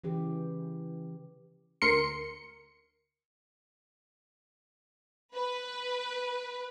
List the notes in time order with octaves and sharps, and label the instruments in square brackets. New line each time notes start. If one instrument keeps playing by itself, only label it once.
[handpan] C#3 E3 G4
[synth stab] D2 A#4 C6 C#7
[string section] B4